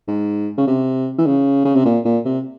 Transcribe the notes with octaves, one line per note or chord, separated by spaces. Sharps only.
G#2
C#3
C3
E3
C#3
C#3
C3
A#2
A#2
C3